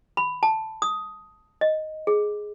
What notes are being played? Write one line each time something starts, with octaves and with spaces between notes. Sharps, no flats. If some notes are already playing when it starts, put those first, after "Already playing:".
B5
A5
D#6
D#5
G#4